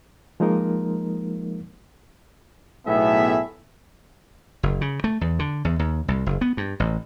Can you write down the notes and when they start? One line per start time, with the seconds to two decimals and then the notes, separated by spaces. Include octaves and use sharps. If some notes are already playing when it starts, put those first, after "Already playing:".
0.40 F3 G#3 A#3 D#4 A#4
2.87 B1 A2 A3 B3 G#4 E5
4.63 F#1
4.81 C#3
5.04 A3
5.21 E2
5.39 D3
5.65 E2
5.79 D#2
6.08 C2
6.26 F#1
6.41 B3
6.57 G2
6.80 A1